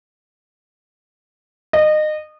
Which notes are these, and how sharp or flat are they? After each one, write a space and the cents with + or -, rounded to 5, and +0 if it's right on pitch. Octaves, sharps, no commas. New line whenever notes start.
D#5 -25